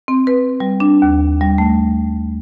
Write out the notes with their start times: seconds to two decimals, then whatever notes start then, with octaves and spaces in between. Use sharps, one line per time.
0.08 C4
0.27 B4
0.60 G3
0.80 D4
1.02 D#2
1.41 G3
1.58 A3